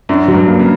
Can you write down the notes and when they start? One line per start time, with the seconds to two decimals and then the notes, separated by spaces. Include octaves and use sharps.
0.09 F#2 D4
0.28 F#3
0.34 G2
0.48 A#3
0.59 C#3